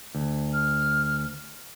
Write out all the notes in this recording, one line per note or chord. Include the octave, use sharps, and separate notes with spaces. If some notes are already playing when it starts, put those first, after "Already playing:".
D2
F6